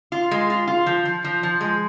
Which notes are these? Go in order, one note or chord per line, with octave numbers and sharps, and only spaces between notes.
F4
G#3
F4
F4
F3
F3
F3
F3
G#3